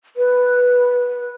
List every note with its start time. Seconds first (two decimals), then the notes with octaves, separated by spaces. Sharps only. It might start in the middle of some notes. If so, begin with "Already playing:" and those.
0.17 B4